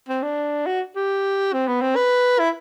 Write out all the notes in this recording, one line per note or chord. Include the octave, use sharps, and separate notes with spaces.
C4
D4
F#4
G4
C4
B3
C4
B4
E4